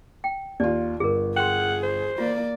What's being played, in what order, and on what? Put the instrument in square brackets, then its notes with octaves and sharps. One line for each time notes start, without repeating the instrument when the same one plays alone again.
[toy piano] G5
[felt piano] D#2 F4 [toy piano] D5
[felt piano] G1 [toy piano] G#4 A#4
[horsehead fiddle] G#4 [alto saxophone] F#5 [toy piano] G5 C6
[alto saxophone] C5
[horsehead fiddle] A#3 D5 [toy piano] F4